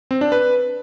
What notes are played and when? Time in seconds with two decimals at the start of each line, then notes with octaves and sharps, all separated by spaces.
0.11 C4
0.21 D4
0.32 B4